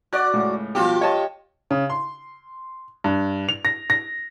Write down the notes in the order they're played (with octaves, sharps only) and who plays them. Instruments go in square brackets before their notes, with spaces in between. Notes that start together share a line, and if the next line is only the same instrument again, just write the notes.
[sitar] F#4 D5 [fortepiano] F#6
[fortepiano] C#2 A2
[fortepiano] B2 F3 G3 [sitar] F4 G4
[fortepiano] C#5 D#5 A5
[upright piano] C#3
C6
G2
F7
A#6
A#6